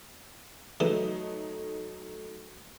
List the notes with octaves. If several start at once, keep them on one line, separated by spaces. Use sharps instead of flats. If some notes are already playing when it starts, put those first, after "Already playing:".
E3 F#3 A3 D#4